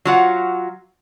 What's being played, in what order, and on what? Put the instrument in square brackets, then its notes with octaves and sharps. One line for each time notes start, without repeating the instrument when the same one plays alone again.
[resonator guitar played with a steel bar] F#3 F4 F#5